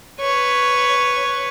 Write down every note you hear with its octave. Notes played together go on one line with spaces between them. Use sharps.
B4 C#5